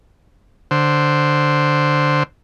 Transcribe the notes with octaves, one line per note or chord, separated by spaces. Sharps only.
D3 C5